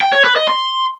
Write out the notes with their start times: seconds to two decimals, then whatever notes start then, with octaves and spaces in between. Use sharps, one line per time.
0.01 G5
0.13 C#5
0.24 B4
0.36 D#5
0.48 C6